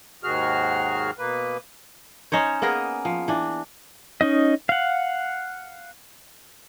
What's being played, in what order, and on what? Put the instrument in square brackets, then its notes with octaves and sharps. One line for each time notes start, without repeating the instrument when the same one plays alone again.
[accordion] D#2 G#2 D#3 F#4 G#4 F6
B2 A#3 B4
[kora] C#4 D#4 C5 C#5
A#3 B3 G#4 A#4
F3
E3 D4
[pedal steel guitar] C#4 D#4 D#5
F5 F#5